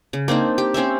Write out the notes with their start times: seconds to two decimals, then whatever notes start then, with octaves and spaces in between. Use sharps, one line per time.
0.13 C#3
0.28 A#3 C4 D4 D#4
0.58 G4
0.74 C4 C#4 C5 E5